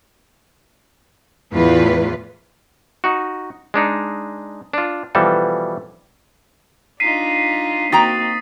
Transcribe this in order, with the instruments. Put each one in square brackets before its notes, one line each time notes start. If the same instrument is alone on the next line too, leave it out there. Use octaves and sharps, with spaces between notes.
[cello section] E2 A2 E3 F4 B4
[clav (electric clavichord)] D#4 F#4
G#3 D4 D#4
D4 F4
B2 E3 F3 G3 A4
[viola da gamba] D4 D#4 F4 [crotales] B6 C7 D#7
[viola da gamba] A#3 C4 D#4 [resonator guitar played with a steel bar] F#4 G5 A#5 [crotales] D#6 A6